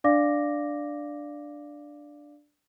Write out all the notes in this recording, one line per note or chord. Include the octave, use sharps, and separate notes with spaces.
D4 D5 F5 D6 A#6